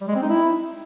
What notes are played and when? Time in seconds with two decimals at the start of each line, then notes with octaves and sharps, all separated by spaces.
0.01 G3
0.08 G#3
0.15 C4
0.22 D#4
0.29 E4